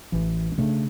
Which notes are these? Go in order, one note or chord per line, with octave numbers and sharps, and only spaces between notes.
A1 E3
C#3 A3 D4